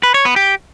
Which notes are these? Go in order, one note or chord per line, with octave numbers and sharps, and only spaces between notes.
B4
C#5
B3
G4